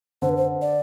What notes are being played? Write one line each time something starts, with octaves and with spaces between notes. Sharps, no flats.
D3 C5
B4
C5
D5